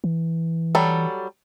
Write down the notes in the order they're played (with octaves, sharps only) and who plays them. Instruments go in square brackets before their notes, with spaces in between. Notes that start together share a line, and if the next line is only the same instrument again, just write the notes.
[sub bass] E3
[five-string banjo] F#3 G3 A4